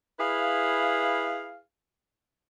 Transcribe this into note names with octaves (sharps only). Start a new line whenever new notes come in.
E4 G#4 B4 F5